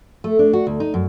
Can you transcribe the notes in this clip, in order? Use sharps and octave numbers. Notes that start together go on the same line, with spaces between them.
A3
D4
F#4
D2
D#4
F#2